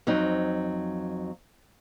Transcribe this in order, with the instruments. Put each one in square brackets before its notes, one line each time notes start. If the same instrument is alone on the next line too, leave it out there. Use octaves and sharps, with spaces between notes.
[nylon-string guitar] F2 F#3 C4 D#4